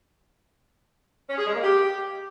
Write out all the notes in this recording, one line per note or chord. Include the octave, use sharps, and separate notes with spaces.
C#4
G#4
G#3
A#3
G4